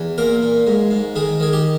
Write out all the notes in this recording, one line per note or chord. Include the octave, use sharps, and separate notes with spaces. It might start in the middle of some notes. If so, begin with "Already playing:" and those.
Already playing: E2
A#2 A#4
A#2
G#2
G#2
D#3 G#4
D#3 G#4
G4